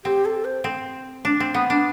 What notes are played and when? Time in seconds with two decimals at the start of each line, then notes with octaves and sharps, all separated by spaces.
0.05 C4 G4
0.25 A4
0.45 C5
0.64 C4
1.25 D4
1.40 C4
1.54 B3
1.70 D4